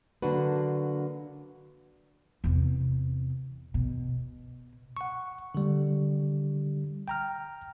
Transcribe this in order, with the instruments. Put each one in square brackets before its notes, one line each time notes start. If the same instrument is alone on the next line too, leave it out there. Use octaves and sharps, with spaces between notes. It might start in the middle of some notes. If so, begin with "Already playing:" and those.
[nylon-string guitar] D3 F#3 A#3 D4 F#4 B4
[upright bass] E2 C3
B2
[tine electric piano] F#5 C#6
D3 G3
G5 A#5 F6